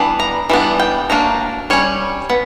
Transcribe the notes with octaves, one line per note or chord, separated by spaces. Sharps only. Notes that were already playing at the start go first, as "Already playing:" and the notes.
Already playing: E3 G3 B3 D4
A#5
E3 G3 B3 D4
G5
F#3 A#3 D4 A#5
G3 C#4 C#5
B3